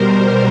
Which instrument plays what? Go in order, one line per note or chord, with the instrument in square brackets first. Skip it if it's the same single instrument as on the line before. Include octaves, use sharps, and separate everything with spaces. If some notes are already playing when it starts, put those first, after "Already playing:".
Already playing: [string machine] B2 G3 A#4 C5